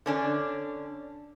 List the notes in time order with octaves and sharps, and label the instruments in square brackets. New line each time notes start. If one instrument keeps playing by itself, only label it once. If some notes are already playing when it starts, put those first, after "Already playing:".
[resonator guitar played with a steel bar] D3 C#4 D4